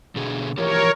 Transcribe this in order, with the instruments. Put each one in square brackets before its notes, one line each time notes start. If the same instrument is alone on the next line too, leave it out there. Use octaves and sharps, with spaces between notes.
[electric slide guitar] B2 D3 G#4
[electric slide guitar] E3 F3 G4 [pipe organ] A#4 C#5